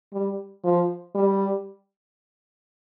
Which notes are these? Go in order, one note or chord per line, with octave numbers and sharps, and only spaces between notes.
G3
F3
G3